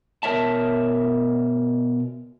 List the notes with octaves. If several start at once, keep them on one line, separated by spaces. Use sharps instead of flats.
B2 A#4 C#5 E5 A5